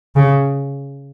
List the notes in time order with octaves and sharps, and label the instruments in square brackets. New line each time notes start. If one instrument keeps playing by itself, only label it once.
[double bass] C#3